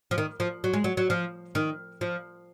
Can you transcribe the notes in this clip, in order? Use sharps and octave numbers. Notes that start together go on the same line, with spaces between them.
F3
D#3
F3
F#3
G#3
F#3
F#3
F3
D#3
F3